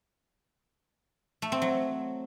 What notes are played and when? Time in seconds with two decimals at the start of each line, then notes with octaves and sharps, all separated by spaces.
1.42 A3
1.52 C4
1.62 F#3